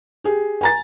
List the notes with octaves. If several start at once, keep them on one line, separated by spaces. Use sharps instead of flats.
G4 G#4
G#5 A#5 A6